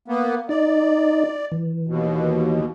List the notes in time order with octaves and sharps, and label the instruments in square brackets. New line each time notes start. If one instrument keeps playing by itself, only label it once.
[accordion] A#3 B3
[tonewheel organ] D#4 D#5 [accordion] D5
[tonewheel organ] E3
[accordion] D#2 B2